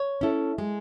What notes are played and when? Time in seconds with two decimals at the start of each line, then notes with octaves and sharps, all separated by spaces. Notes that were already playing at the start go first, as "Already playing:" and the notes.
Already playing: C#5
0.21 C#4 E4 A4
0.58 G#3